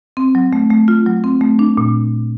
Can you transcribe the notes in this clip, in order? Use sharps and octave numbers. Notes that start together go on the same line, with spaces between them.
C4
F#3
A3
A3
F4
F#3
C4
A3
D4
A#2